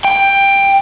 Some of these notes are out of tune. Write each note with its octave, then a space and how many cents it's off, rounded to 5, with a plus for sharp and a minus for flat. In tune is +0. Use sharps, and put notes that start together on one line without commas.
G5 +15